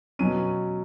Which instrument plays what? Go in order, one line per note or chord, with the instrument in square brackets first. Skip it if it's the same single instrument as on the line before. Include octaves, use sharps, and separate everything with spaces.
[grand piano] B2 F#3 C#4 D#7